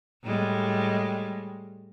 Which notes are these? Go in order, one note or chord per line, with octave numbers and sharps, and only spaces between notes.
A2 G3 G#3